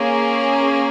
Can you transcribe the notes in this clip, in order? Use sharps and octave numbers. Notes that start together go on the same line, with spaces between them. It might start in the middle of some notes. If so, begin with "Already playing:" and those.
Already playing: A#3 C#4 G#4